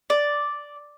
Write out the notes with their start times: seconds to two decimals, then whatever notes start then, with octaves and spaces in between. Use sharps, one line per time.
0.10 D5